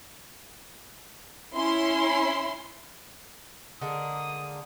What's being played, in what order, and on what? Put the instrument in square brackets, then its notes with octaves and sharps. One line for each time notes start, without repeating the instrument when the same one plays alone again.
[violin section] C#4 E4 C6
[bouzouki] D3 G#3 A#3 [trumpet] D#6